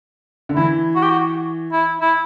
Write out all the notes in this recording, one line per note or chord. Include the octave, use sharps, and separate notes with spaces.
D3
E3 E4
F#4
G4
F#4
E4
E4